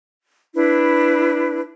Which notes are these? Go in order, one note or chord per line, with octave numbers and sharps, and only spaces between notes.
D4 E4 B4